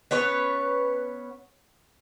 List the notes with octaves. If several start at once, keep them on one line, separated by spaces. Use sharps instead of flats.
B3 C#4 B4 C#5